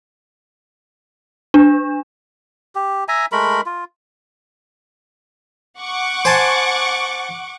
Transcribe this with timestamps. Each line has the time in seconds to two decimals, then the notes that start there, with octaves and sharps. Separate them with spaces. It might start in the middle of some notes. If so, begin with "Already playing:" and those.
1.54 D4
2.75 G4
3.08 E5 G#5 A#5
3.32 G#3 A3 A#4 B5
3.66 F4
5.79 F#5 C#6 D6
6.25 C5 G#5 A5